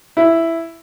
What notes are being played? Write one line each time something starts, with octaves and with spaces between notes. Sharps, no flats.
E4